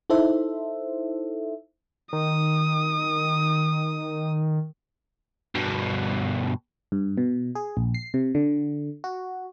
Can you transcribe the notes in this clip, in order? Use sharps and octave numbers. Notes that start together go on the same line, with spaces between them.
D#4 E4 A4 C5 E5
D#3 D#6
G2 B2
G2
B2
G#4
A#1
C7
C3
D3
F#4